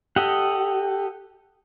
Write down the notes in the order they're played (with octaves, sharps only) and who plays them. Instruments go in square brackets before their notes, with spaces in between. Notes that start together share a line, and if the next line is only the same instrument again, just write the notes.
[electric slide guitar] G4 [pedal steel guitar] A4 D#5 F#5